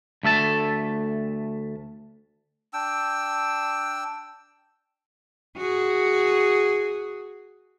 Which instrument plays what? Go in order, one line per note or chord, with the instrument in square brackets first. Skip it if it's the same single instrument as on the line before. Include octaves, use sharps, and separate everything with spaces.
[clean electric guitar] D2 A3 E5 A5
[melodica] D4 G5 E6
[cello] F#4 G#4